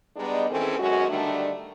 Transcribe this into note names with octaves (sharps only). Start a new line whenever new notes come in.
G3 G#3 B3 D4 D#4
D#3 E3 C4 C#4 G#4 A4
F#2 B2 G#3 C#4 F#4
D3 D#3 G3 A3 D4